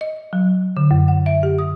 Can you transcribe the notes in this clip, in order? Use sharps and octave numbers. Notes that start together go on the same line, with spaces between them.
D#5
F#3
D3
F#2
F#5
E5
G4
D#6